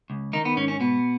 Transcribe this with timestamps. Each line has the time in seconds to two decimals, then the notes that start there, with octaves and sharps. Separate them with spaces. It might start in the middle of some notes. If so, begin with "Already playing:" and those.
0.10 C#2
0.33 D#3 D#4
0.45 B3
0.57 G#2 C#4
0.68 C#4
0.80 B2 B3